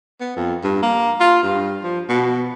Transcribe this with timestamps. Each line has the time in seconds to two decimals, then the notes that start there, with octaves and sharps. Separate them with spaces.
0.21 B3
0.36 F2
0.64 G2
0.83 A#3
1.20 F4
1.43 G2
1.84 F3
2.09 B2